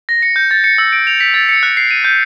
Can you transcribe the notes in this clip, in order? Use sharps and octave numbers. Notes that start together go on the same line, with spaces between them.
A#6
C#7
G6
A6
C#7
E6
D7
F7
B6
A6
C#7
F#6
C7
D#7
G6